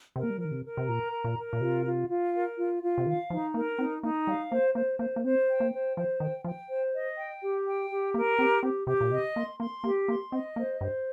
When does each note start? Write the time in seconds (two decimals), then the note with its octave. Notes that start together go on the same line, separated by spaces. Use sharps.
0.16 C3 A#4
0.23 A#3
0.30 G3
0.38 F3 A#4
0.45 D#3
0.51 C3
0.64 A#4
0.77 C3
0.88 A#2 A#5
1.12 A#4
1.24 A#2
1.37 A#4
1.53 A#2
1.61 C3 F4
1.84 F4
2.09 F4
2.34 A#4
2.58 F4
2.82 F4
2.98 C3
3.06 D#3 F5
3.30 F3 D#4
3.54 A#3 A#4
3.78 C4 D#4
4.03 A#3 D#4
4.27 G3 F5
4.51 A#3 C5
4.75 A#3 C5
4.99 A#3 C5
5.16 A#3
5.24 C4 C5
5.49 G5
5.60 A#3
5.72 C5
5.97 F3 C5
6.20 D#3 G5
6.44 F3 G5
6.69 C5
6.93 D#5
7.18 G5
7.42 G4
7.66 G5
7.90 G4
8.14 A#3 A#4
8.38 C4 G4
8.63 C4 G4
8.87 C3 G4
9.01 A#2
9.11 C3 D#5
9.36 A#3 C6
9.60 A#3 C6
9.84 A#3 G4
10.08 A#3 C6
10.32 C4 D#5
10.56 A#3 C5
10.80 G2 C5